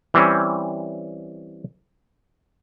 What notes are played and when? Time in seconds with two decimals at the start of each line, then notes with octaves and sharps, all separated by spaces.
0.14 E3 G3 C4 C#4